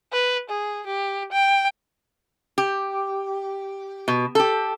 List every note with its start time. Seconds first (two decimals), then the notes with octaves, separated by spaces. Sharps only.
0.13 B4
0.49 G#4
0.87 G4
1.32 G5
2.58 G4
4.08 B2
4.35 G4 A4